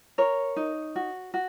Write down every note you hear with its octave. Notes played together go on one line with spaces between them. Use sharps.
A#4 C#5
D#4
F#4
F#4